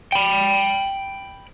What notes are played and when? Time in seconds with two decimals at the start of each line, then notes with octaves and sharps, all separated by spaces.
0.12 G5 B5